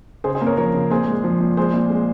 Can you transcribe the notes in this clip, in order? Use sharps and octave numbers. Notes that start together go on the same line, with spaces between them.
C#3 G#4 C5
G#4 C5
A#3
A#4 C#5
F3 A#4 C#5
C#3
A#2 G#4 C5
G#3
F3
A#2
G#3 G#4 C5
A#2
G#3